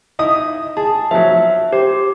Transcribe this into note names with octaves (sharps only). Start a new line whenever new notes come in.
D#4 E4 D#6
G#4 A5
F3 F#3 E5
G4 C5